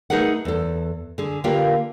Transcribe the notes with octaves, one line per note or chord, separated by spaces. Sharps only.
A3 D#4 G#4 A#4 B4 F#5
E2 A4
D3 G#4
D3 A#3 F4 G4 A#4 B4